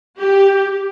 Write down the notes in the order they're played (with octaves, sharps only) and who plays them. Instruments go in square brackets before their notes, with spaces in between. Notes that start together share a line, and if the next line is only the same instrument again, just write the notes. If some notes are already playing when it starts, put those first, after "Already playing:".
[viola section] G4